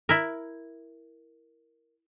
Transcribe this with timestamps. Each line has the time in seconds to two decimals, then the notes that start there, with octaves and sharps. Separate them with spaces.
0.09 E4 A#4